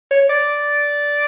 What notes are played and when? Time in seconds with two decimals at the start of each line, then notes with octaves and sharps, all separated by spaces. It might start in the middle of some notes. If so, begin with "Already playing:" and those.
0.11 C#5
0.29 D5